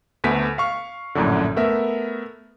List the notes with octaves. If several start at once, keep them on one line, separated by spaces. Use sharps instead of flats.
D2 A3 B3 B6
F5 C#6 F6
A#1 F#2 A2 D3
A3 B3 A#4 E5